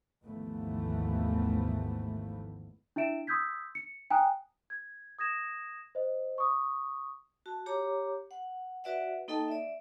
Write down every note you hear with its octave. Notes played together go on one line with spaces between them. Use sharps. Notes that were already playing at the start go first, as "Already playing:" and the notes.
G#1 D#2 E3 F3 A3 B3
D4 E4 E5 D7 E7
C6 D#6 E6 G6 G#6 B6
C#7
G5 G#5 A#5 D#6 F#6
G#6
D#6 G#6 A#6 E7
C5 D#5
C#6 D#6
F#4 A5
G4 C#5 A#5 D6
F#5
F#4 B4 D5 E5 F#5
A#3 D#4 A4 D#5 G5 A5
D5 E5